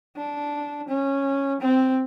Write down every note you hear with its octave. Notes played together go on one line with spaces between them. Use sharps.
D4
C#4
C4